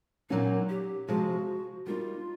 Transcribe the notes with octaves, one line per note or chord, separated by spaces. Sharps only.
A#2 F#3 A#3 C#4 D#4 F#4
G4
C3 F3 G#3 F#4
G3 A#3 D#4 F4